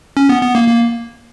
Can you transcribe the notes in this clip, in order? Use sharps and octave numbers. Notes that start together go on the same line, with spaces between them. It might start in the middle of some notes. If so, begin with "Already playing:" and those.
C#4
B3
B3
A#3
A#3